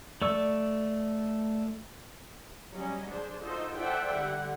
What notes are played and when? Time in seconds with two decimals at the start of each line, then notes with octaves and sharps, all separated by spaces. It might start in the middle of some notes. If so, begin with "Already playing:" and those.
0.22 A3 D5 C#6 E6
2.73 F#3 G3 C#4 D#5
3.10 D4 G#4 C5
3.42 D#4 F4 F#4 A4 C5 D#5
3.78 A4 C5 D5 E5 F#5 G5
4.14 D3 G3 F#5